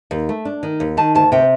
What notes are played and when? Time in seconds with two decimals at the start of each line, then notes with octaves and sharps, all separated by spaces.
0.11 D#2
0.29 A3
0.45 D4
0.63 D#3
0.80 D#2
0.97 D#3 A5
1.15 D2 A5
1.32 C3 G5